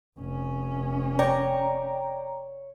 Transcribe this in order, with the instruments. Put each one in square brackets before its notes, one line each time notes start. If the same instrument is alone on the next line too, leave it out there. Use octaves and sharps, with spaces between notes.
[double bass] F1 C#4
[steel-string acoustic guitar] C#5 [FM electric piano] D5 G5 A#5